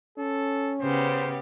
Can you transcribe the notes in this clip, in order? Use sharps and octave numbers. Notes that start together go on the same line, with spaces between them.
C#4 A4
C#3 B3 G4 C5